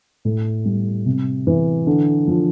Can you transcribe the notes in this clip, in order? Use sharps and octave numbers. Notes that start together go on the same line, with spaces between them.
A2
G3
C3
E3
D3
F3